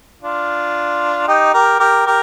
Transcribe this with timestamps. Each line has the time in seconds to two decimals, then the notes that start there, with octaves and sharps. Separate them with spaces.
0.22 D4 F4
1.28 D#4 G4
1.53 G4 A#4
1.79 G4 A#4
2.06 G4 A#4